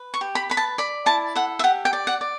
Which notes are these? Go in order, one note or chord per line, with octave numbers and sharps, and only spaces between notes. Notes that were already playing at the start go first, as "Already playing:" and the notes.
Already playing: B4
C#6
G4
B5
B4 B5
A5
D5 B5
E4 A5
A4 F#5
E5
G4 F#5
G5
D5
F#5
D5